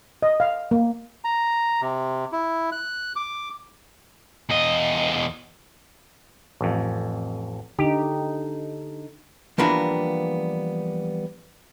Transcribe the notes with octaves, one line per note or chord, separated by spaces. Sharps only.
D#5
F5
A#3
A#5
C3
E4
F#6
D6
E2 D#5
A1 F2
D3 D#4 G4
E3 F3 G3 A#3 B3 D4